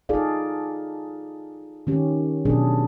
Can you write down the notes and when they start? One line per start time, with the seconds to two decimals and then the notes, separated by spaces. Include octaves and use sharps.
0.09 D#4 F4 G#4 A4 D5 F5
1.87 D#3 C#4 G4
2.45 B2 F#3 C#4 D4 G#4